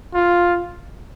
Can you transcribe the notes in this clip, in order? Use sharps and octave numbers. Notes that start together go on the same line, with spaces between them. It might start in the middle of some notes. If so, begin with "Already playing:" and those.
F4